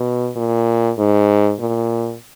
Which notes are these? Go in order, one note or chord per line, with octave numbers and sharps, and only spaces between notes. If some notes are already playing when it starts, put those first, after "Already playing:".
Already playing: B2
A#2
G#2
A#2